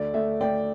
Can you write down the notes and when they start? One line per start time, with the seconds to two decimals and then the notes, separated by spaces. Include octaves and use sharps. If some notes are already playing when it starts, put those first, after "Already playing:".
Already playing: D2 A3 D5
0.14 A3 E5
0.41 A3 D5 G5